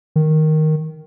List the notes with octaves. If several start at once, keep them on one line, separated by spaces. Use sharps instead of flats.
D#3